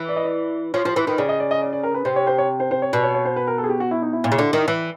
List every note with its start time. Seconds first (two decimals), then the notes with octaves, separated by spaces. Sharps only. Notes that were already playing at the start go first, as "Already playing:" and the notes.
Already playing: E3
0.09 D5
0.16 D#5
0.24 D5
0.74 F3 C#5
0.85 F3 C5
0.96 E3 B4
1.07 D#3 B4
1.18 C#3 D5
1.29 D#5
1.40 D5
1.51 D#5
1.61 D5
1.73 D5
1.83 A#4
1.94 B4
2.05 C3 C5
2.16 C#5
2.27 C5
2.38 C#5
2.60 C5
2.71 C5
2.82 C#5
2.93 B2 D5
3.03 C#5
3.14 C#5
3.25 C5
3.36 B4
3.47 A#4
3.58 A4
3.64 G#4
3.69 G4
3.80 F#4
3.91 E4
4.02 D#4
4.13 E4
4.24 A#2
4.32 C#3
4.39 D3
4.53 D#3
4.68 E3